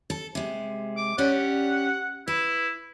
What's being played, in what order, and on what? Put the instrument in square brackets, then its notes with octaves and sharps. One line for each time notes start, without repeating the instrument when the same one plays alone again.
[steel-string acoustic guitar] A4
C3 G#3
[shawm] D6
[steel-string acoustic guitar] C#4 G4 D5 [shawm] F#5
[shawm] E4 [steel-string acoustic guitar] B4